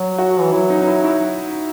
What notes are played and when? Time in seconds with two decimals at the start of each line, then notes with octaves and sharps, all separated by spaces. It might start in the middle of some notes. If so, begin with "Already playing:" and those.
Already playing: F#3
0.18 F#4
0.41 E3
0.52 F#3 E4
0.70 D#4
0.82 D#4
0.87 E4
1.04 E4